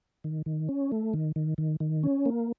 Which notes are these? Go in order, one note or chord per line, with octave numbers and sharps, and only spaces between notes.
D#3
D#3
C#4
A3
D#3
D#3
D#3
D#3
C#4
A#3